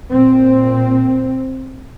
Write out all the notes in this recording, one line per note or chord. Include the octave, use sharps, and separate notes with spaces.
A#2 C4